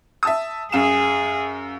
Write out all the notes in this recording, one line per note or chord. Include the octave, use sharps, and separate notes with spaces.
E5 A5 D#6
F#2 G#4 F5 E7